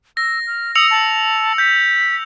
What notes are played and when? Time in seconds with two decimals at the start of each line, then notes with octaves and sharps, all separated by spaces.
0.17 E6 A#6
0.47 F6
0.75 D#6 E6 C#7 F7
0.91 A5
1.58 G6 B6